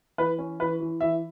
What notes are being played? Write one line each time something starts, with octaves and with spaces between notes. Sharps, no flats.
E3 B4
C#4
E3 B4
E3
E3 E5